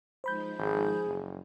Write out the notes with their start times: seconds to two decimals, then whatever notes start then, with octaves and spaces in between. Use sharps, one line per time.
0.24 F3 G#3 D#4 C5 B5 G6
0.58 G#1 G#4
1.06 F#1